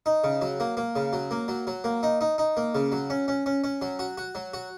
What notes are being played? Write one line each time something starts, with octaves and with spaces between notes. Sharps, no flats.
D#4
C#3
F#3
A#3
A#3
C#3
F#3
A#3
F#3
F#3
A#3
D#4
D#4
D#4
A#3
C#3
F#3
C#4
C#4
C#4
C#4
F#3
F#4
F#4
F#3
F#4